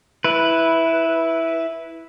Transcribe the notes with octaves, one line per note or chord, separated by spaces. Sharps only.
E4 B4